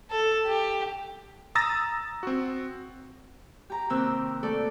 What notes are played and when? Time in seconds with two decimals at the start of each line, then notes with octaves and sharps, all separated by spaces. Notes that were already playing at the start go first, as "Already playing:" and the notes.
0.10 A4
0.46 G4
1.55 A#5 D#6 E6 A6 A#6
2.23 C4 F#4
3.70 G4 A#5
3.90 C3 D#3 A#3 C4 E6 F#6
4.43 A3 A4 D5